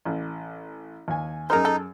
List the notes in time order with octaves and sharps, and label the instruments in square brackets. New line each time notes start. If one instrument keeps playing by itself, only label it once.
[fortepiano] A1
D#2 G#5
[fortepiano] F#2 G#4 F6 [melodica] D#4 [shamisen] A#4 C5
[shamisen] A4